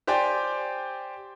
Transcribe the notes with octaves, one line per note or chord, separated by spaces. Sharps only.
G4 C5 D5 G5 G#5